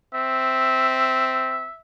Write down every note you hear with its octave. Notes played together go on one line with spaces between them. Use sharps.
C4 E5